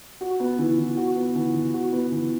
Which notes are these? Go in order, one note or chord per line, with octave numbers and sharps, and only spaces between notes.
F#4
B3
E3
E3
F#4
B3
E3
E3
F#4
B3
E3